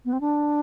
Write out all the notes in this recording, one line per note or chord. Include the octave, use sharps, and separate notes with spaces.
B3
C4
D4